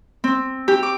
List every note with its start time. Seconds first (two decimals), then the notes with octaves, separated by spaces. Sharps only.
0.24 C4
0.68 G4
0.83 D6